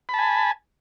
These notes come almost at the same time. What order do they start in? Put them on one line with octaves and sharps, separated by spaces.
B5 A5 G#5